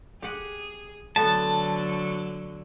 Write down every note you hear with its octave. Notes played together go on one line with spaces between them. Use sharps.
G4 G#4 F#5
D3 F#3 A3 B3 A5